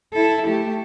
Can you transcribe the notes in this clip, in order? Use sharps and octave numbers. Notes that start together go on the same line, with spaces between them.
E4 A4
A3 G4